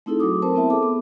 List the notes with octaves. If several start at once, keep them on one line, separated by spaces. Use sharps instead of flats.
A3 C4 D#4 E4 G#4 A4
F#3 A3 F#4 D6 D#6
A3 C4 A#4 C5 A5
B3 C4 E4 E5 A5
G#4 A4 D6
B3